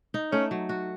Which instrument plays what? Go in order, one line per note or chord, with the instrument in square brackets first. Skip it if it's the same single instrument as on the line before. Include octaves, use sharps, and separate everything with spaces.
[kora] D#4
[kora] A3 [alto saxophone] C#4
[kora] F#3
F#4